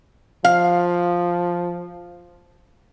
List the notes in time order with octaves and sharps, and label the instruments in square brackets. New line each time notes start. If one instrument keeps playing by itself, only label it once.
[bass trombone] F3 [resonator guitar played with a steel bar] F5